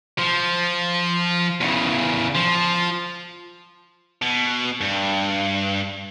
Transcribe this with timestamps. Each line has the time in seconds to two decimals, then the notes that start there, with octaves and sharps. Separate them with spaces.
0.19 F3
1.61 E2 C#3
2.35 F3
4.22 B2
4.81 G2